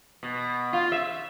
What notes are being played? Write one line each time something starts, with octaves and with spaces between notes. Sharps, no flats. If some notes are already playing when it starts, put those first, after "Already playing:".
B2
F4
E5